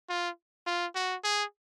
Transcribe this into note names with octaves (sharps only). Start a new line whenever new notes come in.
F4
F4
F#4
G#4